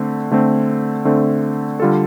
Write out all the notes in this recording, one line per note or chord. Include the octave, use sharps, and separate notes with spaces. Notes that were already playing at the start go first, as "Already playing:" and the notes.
Already playing: D3 A3 C4
D3 A3 C4
D3 A3 C4
D3 G3 F4 A4